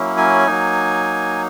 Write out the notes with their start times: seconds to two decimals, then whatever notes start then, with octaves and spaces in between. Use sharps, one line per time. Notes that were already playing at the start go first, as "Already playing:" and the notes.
Already playing: F#3 A#3 C#4 E4
0.17 G#5
0.46 F#3 A#3 D#4